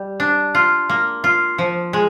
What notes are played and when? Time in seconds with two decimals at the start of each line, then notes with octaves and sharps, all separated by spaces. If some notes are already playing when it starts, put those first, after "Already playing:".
Already playing: G3
0.20 D4
0.55 F4
0.89 A#3
1.24 F4
1.58 F3
1.93 G#3